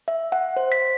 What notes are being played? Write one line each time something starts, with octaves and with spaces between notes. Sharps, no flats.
E5
F#5
C5
B6